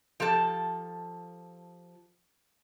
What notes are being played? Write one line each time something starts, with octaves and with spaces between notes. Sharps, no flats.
F3 G4 A4 A5